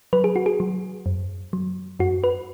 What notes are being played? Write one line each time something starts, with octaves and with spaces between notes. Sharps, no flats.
F#3 B4
G#4
F#4
G#4
F#3
F#2
F#3
F#2 F#4
B4